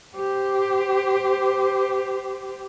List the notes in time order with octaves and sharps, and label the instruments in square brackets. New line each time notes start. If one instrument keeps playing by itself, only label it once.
[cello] G4 C5